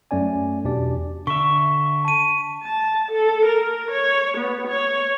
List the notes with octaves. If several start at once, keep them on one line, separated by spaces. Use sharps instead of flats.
F#2 A3 C#4 D5 G#5
E2 B2 D4 G4 D5
D3 E5 C#6 B6
A5 D#7
A5
A4
A#4
C#5
B3
C#5